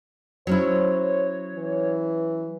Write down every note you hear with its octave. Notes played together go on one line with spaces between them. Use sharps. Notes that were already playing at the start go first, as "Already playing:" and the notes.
F#3 C#4 E4 C5 C#5
E3